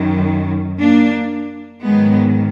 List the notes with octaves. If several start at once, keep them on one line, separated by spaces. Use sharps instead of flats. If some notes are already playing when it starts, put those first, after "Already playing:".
Already playing: F#2 D#3 F#3
A#3 D4
G#2 D#3 F#3 G#3 B3